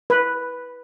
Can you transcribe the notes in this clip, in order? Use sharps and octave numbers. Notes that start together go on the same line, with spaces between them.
B4